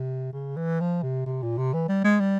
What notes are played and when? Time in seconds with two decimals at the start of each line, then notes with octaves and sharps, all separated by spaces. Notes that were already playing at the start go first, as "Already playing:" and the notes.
Already playing: C3
0.33 C#3
0.56 E3
0.80 F3
1.03 C3
1.26 C3
1.42 A#2
1.58 C3
1.74 E3
1.88 G3
2.04 G#3
2.20 G3